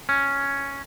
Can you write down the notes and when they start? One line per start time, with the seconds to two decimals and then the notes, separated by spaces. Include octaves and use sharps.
0.09 C#4